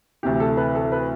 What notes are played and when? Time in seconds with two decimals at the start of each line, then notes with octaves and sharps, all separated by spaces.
0.23 D2 C3 E3 G4
0.40 A4
0.57 B4
0.75 A4
0.92 B4